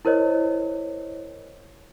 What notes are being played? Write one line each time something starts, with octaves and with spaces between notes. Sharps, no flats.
E4 A#4 C5 C#5 D#5